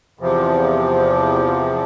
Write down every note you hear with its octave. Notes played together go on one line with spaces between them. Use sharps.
E2 C3 F3